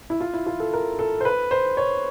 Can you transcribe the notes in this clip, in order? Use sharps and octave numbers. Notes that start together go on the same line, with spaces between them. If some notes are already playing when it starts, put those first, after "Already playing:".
E4
F4
E4
F4
A4
A#4
A4
C5
B4
C5
C#5